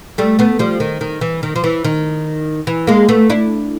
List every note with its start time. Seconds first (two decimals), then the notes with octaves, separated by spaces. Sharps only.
0.18 G3 A3
0.39 A3 B3
0.59 F3 G3
0.80 D#3
1.01 D#3
1.21 E3
1.43 D#3
1.56 F3
1.64 E3
1.84 D#3
2.67 E3
2.87 G#3 A#3
3.09 A3 B3
3.30 D4 E4